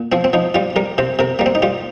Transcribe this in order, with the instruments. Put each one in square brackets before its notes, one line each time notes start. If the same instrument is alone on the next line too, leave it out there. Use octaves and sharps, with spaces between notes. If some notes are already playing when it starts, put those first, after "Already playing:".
Already playing: [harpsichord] A#2
F3 C4
C4
F3 D#4
G3 F4
G3 A#4
C3 C5
C3 A#4
G3 A#3
C4
D#4
G3 F4